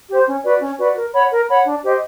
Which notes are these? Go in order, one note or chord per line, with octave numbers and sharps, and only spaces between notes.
G4 C5
C#4
F#4 B4 D5
C#4
F#4 B4 D5
A#4
C#5 F#5 B5
A#4
C#5 F#5 B5
D4
G4 C5 D#5